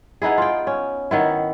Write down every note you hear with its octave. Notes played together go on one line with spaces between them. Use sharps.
B3 D#4 E4 G#4
F4 G5
C#4
D#3 B3 E4